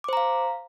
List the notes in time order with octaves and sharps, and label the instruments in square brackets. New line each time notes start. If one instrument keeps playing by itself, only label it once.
[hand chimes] D6
C5
A#5
F5